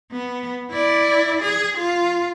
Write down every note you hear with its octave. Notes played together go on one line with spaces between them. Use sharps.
B3
E4 D5
G#4
F4